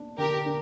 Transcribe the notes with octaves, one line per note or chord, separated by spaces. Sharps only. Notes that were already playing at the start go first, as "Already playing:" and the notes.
Already playing: A#3 D4
D3 G4 A#4
D4